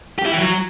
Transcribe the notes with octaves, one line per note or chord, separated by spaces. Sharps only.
G4
E4
E3
F#3